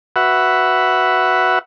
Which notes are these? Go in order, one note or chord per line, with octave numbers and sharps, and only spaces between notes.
F#4 B4 E5 F#5